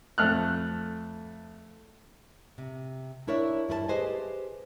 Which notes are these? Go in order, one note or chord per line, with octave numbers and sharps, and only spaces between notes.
F2 A3 F6 F#6
C3
D4 E4 A#4 C#5 D5 E5
G2 E4 B4 A5
G4 G#4 B4 C5 D#5 G#5